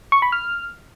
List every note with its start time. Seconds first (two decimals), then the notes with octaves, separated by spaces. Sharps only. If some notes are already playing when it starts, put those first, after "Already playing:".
0.12 C#6
0.22 B5
0.32 F6